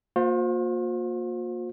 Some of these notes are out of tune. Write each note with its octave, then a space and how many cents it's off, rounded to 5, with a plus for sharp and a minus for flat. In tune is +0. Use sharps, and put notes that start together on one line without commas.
A#3 +0 F4 +45 C5 +0